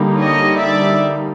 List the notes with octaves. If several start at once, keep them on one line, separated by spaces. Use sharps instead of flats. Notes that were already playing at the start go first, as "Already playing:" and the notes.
Already playing: D3 G3 A#3 D#4
C#5 D#5
D5 E5